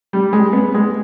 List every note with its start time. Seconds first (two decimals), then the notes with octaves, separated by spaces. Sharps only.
0.13 G3
0.33 G#3
0.53 B3
0.75 G#3